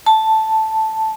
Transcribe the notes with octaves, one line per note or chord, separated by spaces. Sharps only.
A5